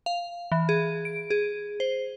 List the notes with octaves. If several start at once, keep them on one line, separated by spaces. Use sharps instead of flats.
F5
E3
G#4
D7
G#4
C5